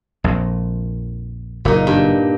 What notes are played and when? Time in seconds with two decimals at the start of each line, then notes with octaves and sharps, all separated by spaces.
0.24 A#1 F2 A#2
1.65 F#1 A#2 D#4
1.87 G2